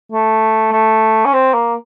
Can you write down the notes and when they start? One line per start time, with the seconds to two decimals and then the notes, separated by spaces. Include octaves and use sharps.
0.12 A3
0.72 A3
1.25 C#4
1.33 C4
1.53 A#3